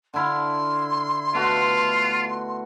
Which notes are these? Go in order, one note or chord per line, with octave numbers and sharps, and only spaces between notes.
D3 E4 F5 C6
B2 A3 F4 F#4